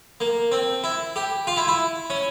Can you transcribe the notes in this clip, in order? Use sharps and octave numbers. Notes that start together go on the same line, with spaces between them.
A#3
C4
E4
G4
F4
E4
E4
C#4